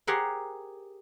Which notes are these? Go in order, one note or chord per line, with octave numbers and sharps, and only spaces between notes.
G4 G#4 A#4 C5 F#5